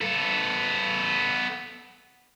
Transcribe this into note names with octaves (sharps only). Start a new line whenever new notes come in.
B3 A4